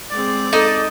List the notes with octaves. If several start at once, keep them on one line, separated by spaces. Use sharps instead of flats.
G#3 C4 D5
D#4 A4 D#5